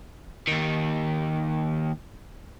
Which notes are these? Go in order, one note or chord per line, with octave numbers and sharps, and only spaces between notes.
D#2 D#3